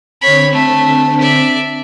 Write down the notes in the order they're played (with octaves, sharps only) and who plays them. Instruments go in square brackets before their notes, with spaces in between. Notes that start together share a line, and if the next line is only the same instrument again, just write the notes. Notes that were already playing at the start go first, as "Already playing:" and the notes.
[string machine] D3 C4 [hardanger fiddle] C#5 B5
[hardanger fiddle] A3
D5 E5